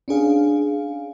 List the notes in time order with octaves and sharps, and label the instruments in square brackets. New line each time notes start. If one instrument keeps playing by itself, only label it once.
[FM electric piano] C#4 D4 G#4 F5